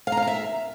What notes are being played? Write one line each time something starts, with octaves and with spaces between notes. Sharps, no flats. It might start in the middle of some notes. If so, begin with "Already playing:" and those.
F5
A#5
F5
A#5
E5